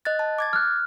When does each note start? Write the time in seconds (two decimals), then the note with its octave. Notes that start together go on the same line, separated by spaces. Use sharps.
0.05 D#5 F#6 A6
0.19 A5
0.39 D6 G#6 A6
0.53 F6 F#6